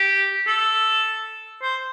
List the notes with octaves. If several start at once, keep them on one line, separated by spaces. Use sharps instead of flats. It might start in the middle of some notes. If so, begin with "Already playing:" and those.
Already playing: G4
A4
C5